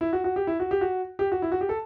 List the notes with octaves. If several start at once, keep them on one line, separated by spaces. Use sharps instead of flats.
E4
F#4
F#4
G4
E4
F#4
G4
F#4
G4
F#4
E4
F#4
G4
A4